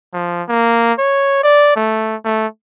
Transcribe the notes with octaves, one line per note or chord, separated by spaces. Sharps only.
F3
A#3
C#5
D5
A3
A3